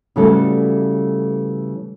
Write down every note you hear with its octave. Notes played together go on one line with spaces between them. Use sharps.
C#3 E3 G3 A3 F#4 A4